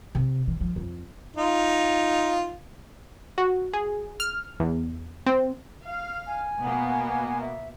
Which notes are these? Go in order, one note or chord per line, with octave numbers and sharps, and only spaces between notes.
C3
E3
F3
F2
D#4 F4
F#4
G#4
F6
E2
C4
F5
G#5
B2 A#3 B3
E5